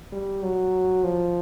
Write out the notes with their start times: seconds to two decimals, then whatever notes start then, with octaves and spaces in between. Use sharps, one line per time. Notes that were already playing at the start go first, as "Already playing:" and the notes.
0.12 G3
0.43 F#3
1.04 F3